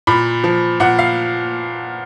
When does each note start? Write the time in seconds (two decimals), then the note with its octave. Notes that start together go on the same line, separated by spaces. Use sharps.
0.07 A#2 B5
0.44 F3
0.80 A#2 F#5
0.99 F5